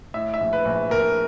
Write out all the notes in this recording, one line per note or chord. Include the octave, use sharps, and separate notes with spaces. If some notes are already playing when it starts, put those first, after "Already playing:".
A2 E5
E5
A#1
B4
A#1
A#1 A#4